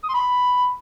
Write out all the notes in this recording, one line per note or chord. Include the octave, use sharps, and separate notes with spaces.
D#6
C6
B5